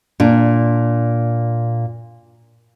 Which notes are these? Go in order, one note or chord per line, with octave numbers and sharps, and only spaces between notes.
A#2 D4